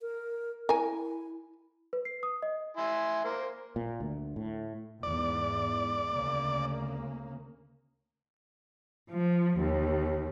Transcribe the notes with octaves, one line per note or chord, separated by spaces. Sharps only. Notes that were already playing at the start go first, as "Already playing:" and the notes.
A#4
E4 A#4 G#5
B4
C7
D#6
D#5
E4 G#5 C6
A#3 C5
A#2
D2
A2
E2 G#2 D5
D2 C#3 A#3
F3
D#2